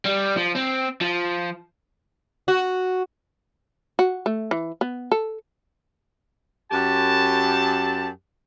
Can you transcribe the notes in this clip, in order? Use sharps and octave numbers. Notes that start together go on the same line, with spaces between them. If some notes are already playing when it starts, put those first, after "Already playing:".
G3
F3
C4
F3
F#4
F#4
A3
E3
B3
A4
F#2 G4 A5